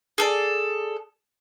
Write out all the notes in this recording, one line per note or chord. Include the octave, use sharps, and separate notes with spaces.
G#4 A4 D5